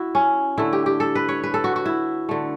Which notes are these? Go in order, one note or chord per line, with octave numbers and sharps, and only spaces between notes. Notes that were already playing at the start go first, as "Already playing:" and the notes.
Already playing: E4 F#4
C#4
D3 A3 E4
G4
G4
A4
B4
C#5
B4
A4
F#4
F#4
E4
D3 A3